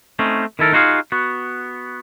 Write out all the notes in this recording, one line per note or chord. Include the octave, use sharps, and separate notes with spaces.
A3 C4 C#4 D#4
D#3 E4 A4 A#4
D#4 F4 F#4 G#4 F5
B3 F#4